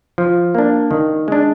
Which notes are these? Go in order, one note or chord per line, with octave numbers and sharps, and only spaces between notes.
F3
A#3 D4
D#3
G#3 D4